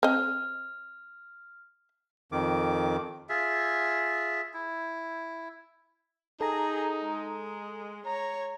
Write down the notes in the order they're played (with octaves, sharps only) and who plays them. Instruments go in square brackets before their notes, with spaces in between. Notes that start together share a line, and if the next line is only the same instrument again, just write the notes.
[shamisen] C4 D#5 [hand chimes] F6
[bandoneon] F2 D#3 D6
[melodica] F4 G#4 E5
E4
[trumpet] D#4 [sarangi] G#4 [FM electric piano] A4 A#5
[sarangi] G#3
[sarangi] C#5 [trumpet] A#5